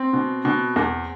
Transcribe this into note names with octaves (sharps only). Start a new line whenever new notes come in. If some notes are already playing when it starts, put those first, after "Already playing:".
Already playing: C4
B2
B2
E2